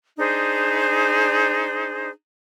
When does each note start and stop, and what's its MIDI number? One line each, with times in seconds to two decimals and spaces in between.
0.17 2.08 62
0.17 2.08 63
0.17 2.08 68
0.17 2.08 72